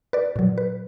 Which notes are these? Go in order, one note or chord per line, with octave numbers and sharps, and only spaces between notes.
B4 D5
A#2 F#3
B4